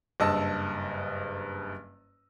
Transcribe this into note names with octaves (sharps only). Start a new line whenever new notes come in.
F#1 G2 D#5 A5 E6